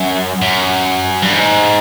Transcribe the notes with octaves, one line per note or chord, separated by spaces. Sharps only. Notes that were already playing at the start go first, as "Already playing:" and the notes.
Already playing: F#2
F#2
G2
G#2